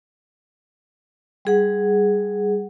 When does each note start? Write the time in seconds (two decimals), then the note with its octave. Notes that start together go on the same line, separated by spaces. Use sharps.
1.45 G3 G#4 F#5